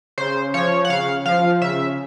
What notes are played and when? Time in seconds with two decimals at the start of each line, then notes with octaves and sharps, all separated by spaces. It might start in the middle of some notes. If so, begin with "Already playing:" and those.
0.18 C#3 C5
0.54 F3 C#5
0.85 F#5
0.90 C#3 F5
1.26 F3 F5
1.61 C#3 E5